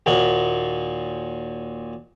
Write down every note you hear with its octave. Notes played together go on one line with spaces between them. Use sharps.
D#2 A#2 D#4 F#4